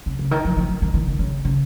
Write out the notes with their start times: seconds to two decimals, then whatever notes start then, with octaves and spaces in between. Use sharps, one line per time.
0.06 C#3
0.19 C#3
0.31 D#3
0.45 F3
0.57 F3
0.69 F3
0.82 D#3
0.94 D#3
1.08 D#3
1.19 C#3
1.45 C#3